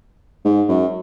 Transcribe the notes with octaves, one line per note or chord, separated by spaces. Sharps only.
G#2
F#2